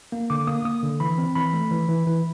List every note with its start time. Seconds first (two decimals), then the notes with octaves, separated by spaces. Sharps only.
0.12 A#3
0.30 D3 D6
0.47 A#3 D#6
0.65 A#3 D#6
0.83 D3
1.00 E3 B5
1.18 C4
1.35 E3 B5
1.54 A3
1.71 E3
1.89 E3
2.07 E3